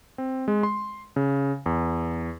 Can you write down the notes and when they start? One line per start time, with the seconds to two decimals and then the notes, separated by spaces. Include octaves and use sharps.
0.18 C4
0.48 G#3
0.63 C6
1.16 C#3
1.66 E2